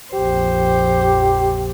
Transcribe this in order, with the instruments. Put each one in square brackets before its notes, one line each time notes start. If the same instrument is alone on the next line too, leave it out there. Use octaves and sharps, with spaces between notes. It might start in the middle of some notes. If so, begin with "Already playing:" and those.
[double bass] A#1 F2 [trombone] G4 [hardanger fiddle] C5